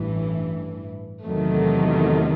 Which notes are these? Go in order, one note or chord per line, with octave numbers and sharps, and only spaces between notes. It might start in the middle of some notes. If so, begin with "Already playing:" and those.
Already playing: A1 G2 E3
E2 C3 D#3 F#3 A3